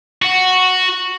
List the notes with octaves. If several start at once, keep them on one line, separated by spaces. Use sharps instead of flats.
F#4